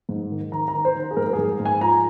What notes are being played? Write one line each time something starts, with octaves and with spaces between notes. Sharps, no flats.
G#2
D#3
D#3 A#5
A#5
D#3
C5
D#3
G#4
G#2 A#4
A#4
G#4
G#2
G#2
G#5
F3 A#5